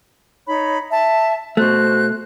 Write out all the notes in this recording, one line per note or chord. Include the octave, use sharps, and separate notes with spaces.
D#4 C#5 B5
E5 A5
B2 A3 F#4 C5 F#6